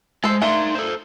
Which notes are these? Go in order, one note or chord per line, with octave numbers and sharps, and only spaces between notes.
G#3 A4 C5
A3 A#3 D4 D#4 C6
A4 C5